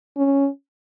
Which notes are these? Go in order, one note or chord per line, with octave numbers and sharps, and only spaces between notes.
C#4